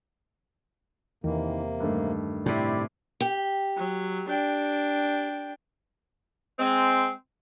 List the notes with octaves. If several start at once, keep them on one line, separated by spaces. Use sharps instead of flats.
E2 C3 D#3 E3 A#3
G2 D#3 A3
A2 C3 E4 G4 D5
G4
F#3
D4 G5
G#3 C4